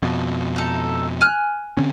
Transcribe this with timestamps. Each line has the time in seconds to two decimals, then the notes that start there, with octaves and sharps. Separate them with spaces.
0.02 F2 B2
0.56 D#4 A4
1.21 G#5 F6 F#6
1.77 D3 C4 C#4